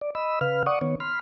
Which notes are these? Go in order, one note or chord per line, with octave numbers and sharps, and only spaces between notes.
D5
D#5 B5 E6
C#3 B4 F5 F6
D5 F#5 C#6 D#6
D#3 B3 C#5
B5 C6 F6